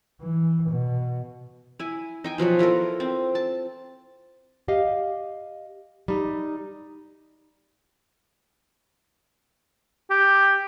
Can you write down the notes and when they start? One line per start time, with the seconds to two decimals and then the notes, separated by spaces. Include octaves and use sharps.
0.21 E3
0.70 B2
1.79 E4 G#5
2.24 D#4 G5 G#5
2.38 B2 F3 F#3 F#4
2.59 E4 F4 A4 A#4
3.00 C4
3.35 A5
4.68 G4 D#5 F5
6.08 G3 D#4
10.11 G4